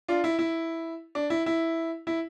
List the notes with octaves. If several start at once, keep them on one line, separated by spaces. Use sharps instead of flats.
D4 F4
E4
E4
D4
E4
E4
E4